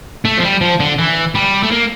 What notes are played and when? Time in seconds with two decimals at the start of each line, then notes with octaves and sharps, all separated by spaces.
0.25 A3
0.37 F3
0.43 G3
0.61 F3
0.80 D3
0.99 E3
1.35 G3
1.63 A3
1.72 A#3